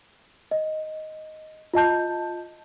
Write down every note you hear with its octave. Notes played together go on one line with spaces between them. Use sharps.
D#5
F4 D#5 A5 G6